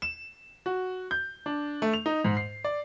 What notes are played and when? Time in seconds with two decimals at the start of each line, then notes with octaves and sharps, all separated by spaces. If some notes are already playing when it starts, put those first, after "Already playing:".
0.02 E7
0.66 F#4
1.11 G6
1.46 D4
1.82 A3
1.93 F7
2.06 D#4
2.25 G#2
2.37 C7
2.64 D5